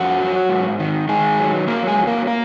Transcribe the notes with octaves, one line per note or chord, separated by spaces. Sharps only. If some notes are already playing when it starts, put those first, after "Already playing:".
Already playing: F2 F#4
F#3
G#2
D#3
D#3 G#3 G#4
F#3
F#3 A#3 A#4
G#3 G#4
F2
A#3 A#4
A#3 A#4